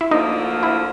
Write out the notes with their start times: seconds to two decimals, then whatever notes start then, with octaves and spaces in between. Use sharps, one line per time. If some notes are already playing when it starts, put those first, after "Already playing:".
0.01 E4
0.11 D2 D3 F3 A#3 D#4
0.63 E4